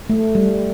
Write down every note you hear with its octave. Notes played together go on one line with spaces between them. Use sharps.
A3
G3